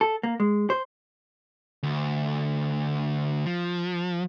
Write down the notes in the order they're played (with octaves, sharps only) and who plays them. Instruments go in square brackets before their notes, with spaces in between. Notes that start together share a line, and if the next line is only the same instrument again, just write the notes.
[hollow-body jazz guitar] A4
A#3
G#3
C5
[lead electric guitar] D2
F3